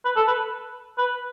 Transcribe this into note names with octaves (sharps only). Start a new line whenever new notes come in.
B4
A4
B4
B4